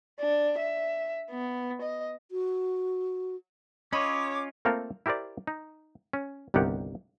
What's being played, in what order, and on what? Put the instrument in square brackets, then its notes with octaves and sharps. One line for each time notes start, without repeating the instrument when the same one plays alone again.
[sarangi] D4
E5
B3
D#5
[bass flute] F#4
[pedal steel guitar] C#4 F4 [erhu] C#5 [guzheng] D#5 B5 [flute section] D6
[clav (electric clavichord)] A3 A#3 C4 F4 A4 A#4
E4 G4 A#4 C5 D5
D#4
C#4
G1 C2 D#3 G4 F#5